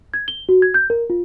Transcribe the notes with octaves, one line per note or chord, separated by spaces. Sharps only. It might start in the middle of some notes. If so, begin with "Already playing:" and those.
G#6
G7
F#4
G#6
G6
A#4
F4